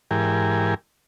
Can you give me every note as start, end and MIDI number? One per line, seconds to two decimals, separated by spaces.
0.11 0.74 44
0.11 0.74 52
0.11 0.74 67
0.11 0.74 70
0.11 0.74 80